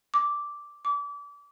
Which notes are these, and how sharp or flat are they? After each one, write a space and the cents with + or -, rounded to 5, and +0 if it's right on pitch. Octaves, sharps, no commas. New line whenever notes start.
D6 -5
D6 -30